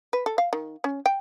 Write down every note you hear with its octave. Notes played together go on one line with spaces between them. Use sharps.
B4
A4
F5
D#3
C#4
G5